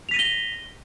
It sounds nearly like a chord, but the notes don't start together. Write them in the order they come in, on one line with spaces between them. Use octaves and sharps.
F7 B6 D#7 A#6 G7